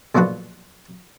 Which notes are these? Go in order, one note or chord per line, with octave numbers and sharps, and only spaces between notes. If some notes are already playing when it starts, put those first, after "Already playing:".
B1 A#2 F3 D4 F#4 B4